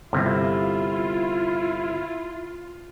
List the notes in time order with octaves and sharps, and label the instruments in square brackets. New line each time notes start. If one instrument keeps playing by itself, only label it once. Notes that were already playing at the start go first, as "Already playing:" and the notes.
[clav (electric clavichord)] G1 C3 [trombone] E4 [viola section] F4